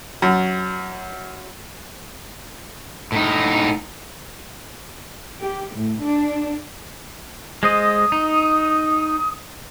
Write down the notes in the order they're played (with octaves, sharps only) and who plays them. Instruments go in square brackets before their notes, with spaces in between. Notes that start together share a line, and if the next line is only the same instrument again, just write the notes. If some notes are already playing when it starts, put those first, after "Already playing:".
[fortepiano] F#2
[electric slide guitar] A2 D#4
[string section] G4
A2
D4
[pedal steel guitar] G#3 C5 D#5 [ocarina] D#6
[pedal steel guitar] D#4